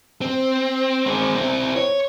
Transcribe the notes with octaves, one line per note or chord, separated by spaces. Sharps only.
C4
G#3 C4
C4 E4
C#5